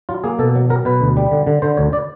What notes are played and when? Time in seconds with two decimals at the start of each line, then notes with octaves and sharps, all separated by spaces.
0.09 F#3 F4
0.24 A#3 G#4
0.39 B2 A4
0.55 F#3
0.70 F#3 A#4
0.85 B2 B4
1.01 D2
1.17 G3
1.31 D3
1.47 D3
1.62 D3 C5
1.77 D2 C#5
1.93 D5